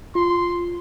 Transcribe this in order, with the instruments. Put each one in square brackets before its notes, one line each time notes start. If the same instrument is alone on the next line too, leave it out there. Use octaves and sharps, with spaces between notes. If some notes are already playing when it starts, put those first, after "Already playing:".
[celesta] F4 [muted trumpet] C6